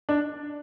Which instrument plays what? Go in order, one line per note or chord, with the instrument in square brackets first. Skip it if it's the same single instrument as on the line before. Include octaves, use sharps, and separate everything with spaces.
[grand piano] D4